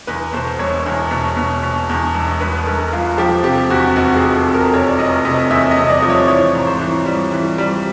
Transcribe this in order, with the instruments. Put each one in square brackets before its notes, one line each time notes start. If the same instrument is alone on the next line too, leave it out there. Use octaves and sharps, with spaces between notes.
[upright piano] E2 B4
B2 C5
E1 C#5
E2
B2
B2
B2
E2
E1
E1 B4
E1 A#4
E1 F4
F3 G4
C3 G4
E2 F#4
F1 F#4
G#4
F1
A4
C3 A4
A#4
F1 C#5
D5
F1 D#5
C3 D#5
E2 E5
D#5
C3
D#5
D5
F3
C#5
E3 C#5
G#2
C5
E3
G3
E3
G3